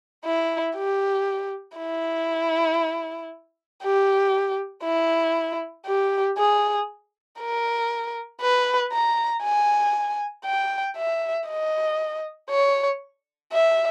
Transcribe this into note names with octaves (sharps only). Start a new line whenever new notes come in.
E4
G4
E4
G4
E4
G4
G#4
A#4
B4
A#5
G#5
G5
E5
D#5
C#5
E5